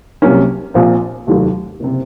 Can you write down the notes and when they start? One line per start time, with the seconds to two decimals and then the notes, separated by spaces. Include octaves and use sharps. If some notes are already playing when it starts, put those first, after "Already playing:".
0.22 C2 C3 F#3 A#3 C#4
0.74 A#1 A#2 F3 C4
1.27 F1 D#2 D#3 F#3 A3
1.80 F#1 C3